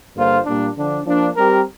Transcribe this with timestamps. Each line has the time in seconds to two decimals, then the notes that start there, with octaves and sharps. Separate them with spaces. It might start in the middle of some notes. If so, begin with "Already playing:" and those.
0.15 G2 D3 A#3 F4 C5
0.45 A#2 G3 A#3 D4
0.76 D3 F3 D4
1.06 F3 A#3 D4
1.36 G3 C4 G4 A#4